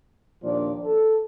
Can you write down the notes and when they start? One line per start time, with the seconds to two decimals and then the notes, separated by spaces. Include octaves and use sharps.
0.43 D#2 A#2 F3 D4 F4 D5
0.85 A4